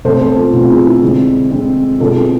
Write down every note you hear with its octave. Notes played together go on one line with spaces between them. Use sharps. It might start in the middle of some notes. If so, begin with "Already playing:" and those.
B2 A3 C4 A4 C5
A4 C5
F4
B2 A3 C4 F4
E4 G#4
E4
D3 G#3 C4
D3 G#3 C4
B2 G#3 C4 F4 A4
E4 G#4